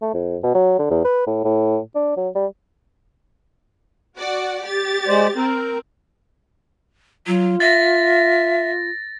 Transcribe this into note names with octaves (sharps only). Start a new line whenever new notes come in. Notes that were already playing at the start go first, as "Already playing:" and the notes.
A3
F2
B2
F#3
D3
E2
B4
A2
A2
D4
F#3
G3
F#4 D5 F#5
G4 A6
G#3 C5 D5
C4 A#4
F#3 F4
E5 A6 A#6